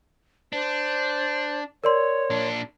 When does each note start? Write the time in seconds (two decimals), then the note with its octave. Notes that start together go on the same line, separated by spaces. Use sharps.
0.53 D4 C5
1.84 A#4 C#5 D5 C6
2.30 A#2 D4